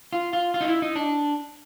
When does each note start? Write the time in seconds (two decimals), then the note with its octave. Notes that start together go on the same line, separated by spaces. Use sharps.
0.13 F4
0.33 F4
0.54 F4
0.61 D#4
0.68 E4
0.82 D#4
0.95 D4